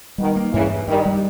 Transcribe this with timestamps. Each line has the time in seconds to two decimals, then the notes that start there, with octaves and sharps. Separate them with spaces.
0.18 B2 D#3 G3
0.36 A#3
0.53 G2 C#3 E3
0.71 G2
0.87 G2 D#3 G3
1.06 G3